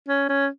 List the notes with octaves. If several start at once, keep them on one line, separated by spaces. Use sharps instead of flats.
C#4
C#4